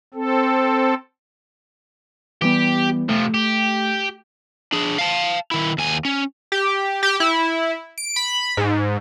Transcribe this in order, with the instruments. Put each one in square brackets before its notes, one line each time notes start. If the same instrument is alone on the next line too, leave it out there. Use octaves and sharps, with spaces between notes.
[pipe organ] C4 A4
[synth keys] E3 G3 B3 [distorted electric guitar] G4
[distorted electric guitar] C3 F3 [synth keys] A3
[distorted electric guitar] G4
[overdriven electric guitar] D4 G#4
F5 A5
D#3 E4
D#2 G#5
C#4
[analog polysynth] G4
G4
E4
D7
B5
G#2